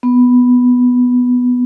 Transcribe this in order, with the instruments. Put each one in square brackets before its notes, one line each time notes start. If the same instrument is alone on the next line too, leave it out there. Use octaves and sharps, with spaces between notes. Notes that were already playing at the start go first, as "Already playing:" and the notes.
[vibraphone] B3